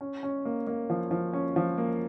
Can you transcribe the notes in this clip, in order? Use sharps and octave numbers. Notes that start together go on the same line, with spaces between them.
C#4
C#4
A#3
A#3
F3
F3
C#4
F3
A#3